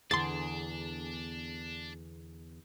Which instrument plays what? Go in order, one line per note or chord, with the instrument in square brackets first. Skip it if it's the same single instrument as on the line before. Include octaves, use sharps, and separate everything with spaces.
[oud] E2 [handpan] D3 B3 G#4 [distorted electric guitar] D4 [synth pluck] C6 A6